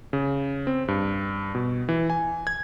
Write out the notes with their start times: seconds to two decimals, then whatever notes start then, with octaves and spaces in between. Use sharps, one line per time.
0.13 C#3
0.67 C4
0.88 G2
1.55 B2
1.89 E3
2.10 G#5
2.47 G#6